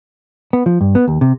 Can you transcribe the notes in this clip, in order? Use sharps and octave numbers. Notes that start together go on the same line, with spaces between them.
B3
F3
G2
B3
D#2
C3